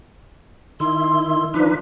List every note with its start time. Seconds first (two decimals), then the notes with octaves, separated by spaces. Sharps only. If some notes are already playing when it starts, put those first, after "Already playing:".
0.80 D#3 E4 C6
1.54 F3 D4 D#4 B4